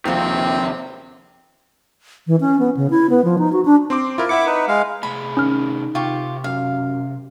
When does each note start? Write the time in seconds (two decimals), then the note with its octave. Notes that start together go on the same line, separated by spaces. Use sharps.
0.05 D#2 C3 D#3 F3 C4
2.27 E3
2.41 C#4
2.59 B3
2.77 C#3
2.90 E4
3.10 B3
3.24 F3
3.38 D#4
3.53 F#4
3.65 D4
3.90 C4 C6 D6
4.18 E4 F4 A#4
4.29 E4 E5 F#5 D6 C#7
4.46 D#4 B4
4.68 G#3 F5
5.03 C3 A3 G#4 B5
5.37 D#3 C#4 F6
5.95 C3 F4 G4 C#6
6.44 F#2 F5